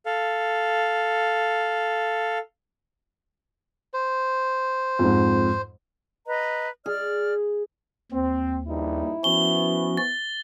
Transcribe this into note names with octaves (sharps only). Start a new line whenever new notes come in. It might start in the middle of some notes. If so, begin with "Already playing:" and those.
A4 F5
C5
F2 G#2
B4 D#5 A#5
G#4 D5 F6
D#2 C4
A#1 G2 D#4 E4
F3 B3 C#4 F#4 G7
A6